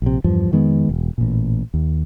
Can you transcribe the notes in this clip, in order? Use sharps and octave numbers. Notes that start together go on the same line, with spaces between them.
A#1 C3
E2 G2 F3
F2 D#3 G#3 B3
E1
A1 A#2
D#2